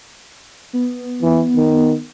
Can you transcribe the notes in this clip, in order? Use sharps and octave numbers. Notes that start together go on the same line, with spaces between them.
B3
E3
D#3